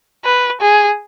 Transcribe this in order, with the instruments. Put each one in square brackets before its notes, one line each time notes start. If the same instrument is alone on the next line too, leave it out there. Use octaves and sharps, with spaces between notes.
[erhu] B4
G#4